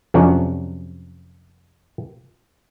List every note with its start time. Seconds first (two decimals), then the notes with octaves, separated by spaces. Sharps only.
0.14 F2 C3 F#3 C#4 D4 F#5